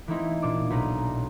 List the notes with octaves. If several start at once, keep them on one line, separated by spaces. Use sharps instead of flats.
E3 A3 A#3 C4 D#4 E4
A#2 D4 D6
B1 B4 A#5